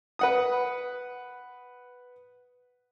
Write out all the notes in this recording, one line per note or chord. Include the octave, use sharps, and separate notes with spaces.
B4 F#5 D#6